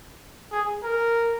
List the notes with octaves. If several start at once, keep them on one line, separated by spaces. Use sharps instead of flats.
G#4
A#4